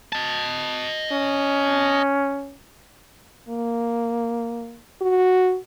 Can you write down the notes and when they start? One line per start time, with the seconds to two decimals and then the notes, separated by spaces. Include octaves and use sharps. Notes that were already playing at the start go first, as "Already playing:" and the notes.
0.13 D#5 A5
1.12 C#4
3.49 A#3
5.01 F#4